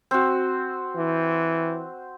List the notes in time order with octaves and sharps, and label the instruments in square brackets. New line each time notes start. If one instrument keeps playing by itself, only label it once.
[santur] C4 F#4
[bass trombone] E3